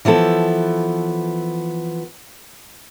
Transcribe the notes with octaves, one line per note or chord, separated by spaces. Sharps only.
E3 F3 B3 A4